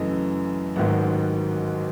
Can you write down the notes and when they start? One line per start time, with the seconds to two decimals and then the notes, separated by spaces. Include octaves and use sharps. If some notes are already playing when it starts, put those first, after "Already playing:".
Already playing: F#2 C#3 E3 A3 D#5
0.76 A1 G#2 D#3 F#3 F#5